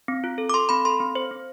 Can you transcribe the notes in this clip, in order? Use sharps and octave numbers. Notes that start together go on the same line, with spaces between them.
C4
F4
A4
D6
A4 C6
C4 B5
A4 C6
C4
C4 C5
C4